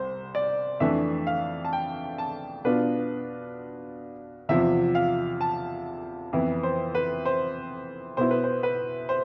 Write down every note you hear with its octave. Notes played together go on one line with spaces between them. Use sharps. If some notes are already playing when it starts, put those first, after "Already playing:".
Already playing: C2 C5
D5
F2 E3 A3 D4 E5
F5
A5
G5
A5
B2 B3 D4 F4 B4
E2 C3 F3 E5
F5
A5
F2 E3 B3 E4
C5
B4
C5
B2 B3 E4 C5
B4
C5
B4
C5